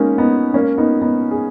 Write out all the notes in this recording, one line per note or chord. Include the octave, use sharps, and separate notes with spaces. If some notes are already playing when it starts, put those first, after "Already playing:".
Already playing: G#3 A#3 B3 C#4 D#4
B3 D#4
A#3 C#4
B3 D#4
B3 D#4
G#4